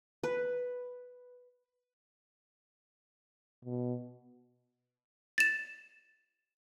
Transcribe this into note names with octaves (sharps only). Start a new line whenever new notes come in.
B4
B2
A6 E7